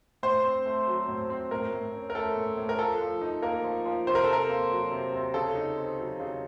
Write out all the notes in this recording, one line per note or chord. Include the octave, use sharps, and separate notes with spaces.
A2 C5
C4
A3
F#3
A2
C4
A2 A#4
A2
C#4
A#4
A3 A4
A2
A2
A#4
F3 A4
F3
D#4
A#3 A#4
F3
F3
C3 C5
A#4
C3 A4
A#4
A#3
F#3
C3
C3
C#3 A4
D#4
C4
F#3
C#3